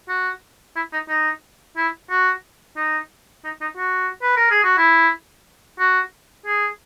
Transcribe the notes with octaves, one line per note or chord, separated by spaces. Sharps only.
F#4
E4
D#4
D#4
E4
F#4
D#4
D#4
D#4
F#4
B4
A#4
G#4
F#4
E4
F#4
G#4